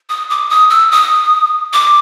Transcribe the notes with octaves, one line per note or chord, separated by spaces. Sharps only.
D#6
D6
D#6
E6
D#6
D6